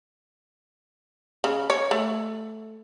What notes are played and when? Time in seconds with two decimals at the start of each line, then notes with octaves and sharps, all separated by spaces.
1.44 C#3
1.70 C#5
1.91 A3